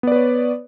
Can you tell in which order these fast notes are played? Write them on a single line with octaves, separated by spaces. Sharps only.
B3 D5 B4 C#5